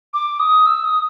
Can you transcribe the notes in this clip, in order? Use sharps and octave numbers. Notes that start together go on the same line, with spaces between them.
D6
D#6
E6
D#6